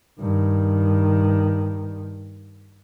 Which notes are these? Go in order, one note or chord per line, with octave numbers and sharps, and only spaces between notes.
G2 D#3